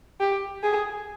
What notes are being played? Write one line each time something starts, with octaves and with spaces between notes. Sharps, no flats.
G4
G#4